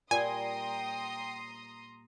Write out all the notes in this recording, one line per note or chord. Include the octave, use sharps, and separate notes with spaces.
A#2 G3 G5 G#5 A#5 C6 D#6